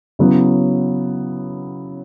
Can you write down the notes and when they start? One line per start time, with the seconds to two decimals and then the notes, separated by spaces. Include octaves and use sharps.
0.19 C#3 F#3 B3 E4